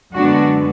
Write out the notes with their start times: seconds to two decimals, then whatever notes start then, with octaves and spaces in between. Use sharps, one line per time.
0.15 F#2 D3 G#3 B3 D4 F#4